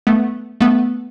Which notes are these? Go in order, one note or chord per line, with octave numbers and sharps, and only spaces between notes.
A3 B3
A3 B3